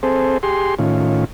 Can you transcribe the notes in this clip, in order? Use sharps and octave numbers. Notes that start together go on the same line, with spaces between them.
C4 G#4 A4 C5
G4 G#4 C6
A2 D#3 C#4 F4